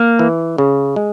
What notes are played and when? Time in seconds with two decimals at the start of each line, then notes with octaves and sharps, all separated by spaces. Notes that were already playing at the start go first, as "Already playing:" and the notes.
Already playing: A#3
0.19 E3
0.58 C#3
0.96 G#3